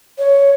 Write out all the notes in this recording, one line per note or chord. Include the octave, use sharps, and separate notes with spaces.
C#5